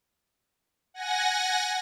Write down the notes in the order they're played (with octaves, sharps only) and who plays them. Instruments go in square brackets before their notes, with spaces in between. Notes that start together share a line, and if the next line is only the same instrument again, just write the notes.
[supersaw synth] F#5 G#5 A#6